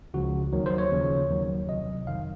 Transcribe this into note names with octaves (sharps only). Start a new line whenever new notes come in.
C#2 C#3 F3 F#4
D#2 D#3 F#3
C5
C#5
D#2 C#3 F3
D#2 D#3 F#3
C2 C3 F#3 D#5
F2 D#3 F#3 F5